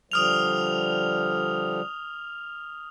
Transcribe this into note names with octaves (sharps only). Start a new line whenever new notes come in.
D3 F3 G3 D#6 F6 F7